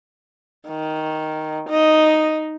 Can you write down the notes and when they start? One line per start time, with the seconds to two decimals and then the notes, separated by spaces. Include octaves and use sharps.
0.68 D#3
1.70 D#4 D#5